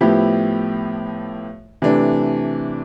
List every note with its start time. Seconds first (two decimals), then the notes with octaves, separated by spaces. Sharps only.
0.01 A2 F3 B3 E4 G4
1.82 C3 E3 A3 D4